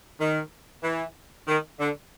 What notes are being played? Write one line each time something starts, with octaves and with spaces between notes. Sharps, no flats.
D#3
E3
D#3
D3